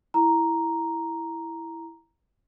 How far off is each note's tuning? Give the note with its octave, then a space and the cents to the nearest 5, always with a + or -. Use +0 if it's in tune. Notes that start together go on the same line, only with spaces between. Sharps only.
E4 +0 A#5 +0